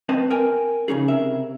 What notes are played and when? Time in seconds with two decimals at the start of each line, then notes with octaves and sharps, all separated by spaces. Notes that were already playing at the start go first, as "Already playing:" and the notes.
0.09 C4 B4 D#5 A5
0.30 A#4 G5 G#5
0.88 C#3 C#4 D#4 G#4
1.08 C3 A#4 E5